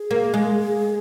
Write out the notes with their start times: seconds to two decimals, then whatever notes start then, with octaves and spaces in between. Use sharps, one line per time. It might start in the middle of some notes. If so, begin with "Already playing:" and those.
Already playing: G#4
0.11 A#3
0.34 G#3